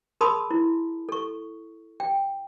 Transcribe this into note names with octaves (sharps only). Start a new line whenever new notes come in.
G#4 A#4 A5 B5 C6 D#6
E4
A4 C#6
G5